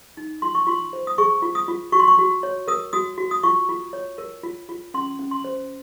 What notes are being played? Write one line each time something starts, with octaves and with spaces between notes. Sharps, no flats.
D#4
F4 C6
C#6
F4 C6
C5
D#6
G#4 C#6
F4
D#6
F4
F#4 C#6
C6
C#6
F#4
C#5
A#4 D#6
F#4 D#6
F#4
D#6
F4 C#6
F4
C#5
A#4
F4
F4
C#4 C6
C#4
C6
C5